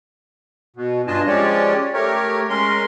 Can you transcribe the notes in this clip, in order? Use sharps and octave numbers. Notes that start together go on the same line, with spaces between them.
B2
G2 D4 F4 D#5 G#5 A5
F3 G#3 C#4 G4 C#5 D5
A3 G4 A#4 C#5
G#3 C#4 A#4 C6